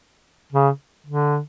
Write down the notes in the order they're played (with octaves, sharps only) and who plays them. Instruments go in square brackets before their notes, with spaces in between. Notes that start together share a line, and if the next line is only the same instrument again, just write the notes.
[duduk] C#3
D3